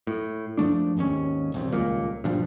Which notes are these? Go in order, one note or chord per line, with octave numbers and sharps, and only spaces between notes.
A2
F#2 F3 A3 D4
G#1 D#2 C#4
D#1 C2 F2
D#1 C#2 A#2 A#3
G2 A#2 F3